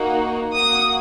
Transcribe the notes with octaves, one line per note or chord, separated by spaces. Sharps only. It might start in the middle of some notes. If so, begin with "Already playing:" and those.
Already playing: A#3 D#4 F#4
A#3 F#4 D#6